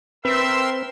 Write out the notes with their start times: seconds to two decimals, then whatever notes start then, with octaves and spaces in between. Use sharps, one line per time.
0.25 C4 A#4 B4 E5 C6 E6